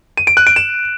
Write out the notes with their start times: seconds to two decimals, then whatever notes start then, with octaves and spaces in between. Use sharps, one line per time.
0.17 D#7
0.27 D7
0.37 F#6
0.47 D7
0.56 E7